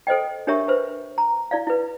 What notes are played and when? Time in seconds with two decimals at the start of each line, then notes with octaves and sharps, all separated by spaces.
0.07 A4 C5 D#5 G5
0.47 D4 G4 A#4 C#5 E5 C#6
0.68 B4 C5
1.18 A#5
1.51 E4 D5 F5
1.67 E4 B4